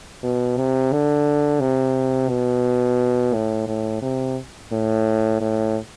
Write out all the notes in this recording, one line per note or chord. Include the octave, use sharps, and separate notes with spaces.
B2
C3
D3
C3
B2
A2
A2
C3
A2
A2